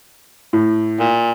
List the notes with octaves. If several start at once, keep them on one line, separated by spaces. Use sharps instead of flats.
A2
A#2